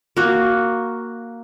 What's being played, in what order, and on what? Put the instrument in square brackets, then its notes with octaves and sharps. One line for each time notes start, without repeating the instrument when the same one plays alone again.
[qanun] A#3 F#4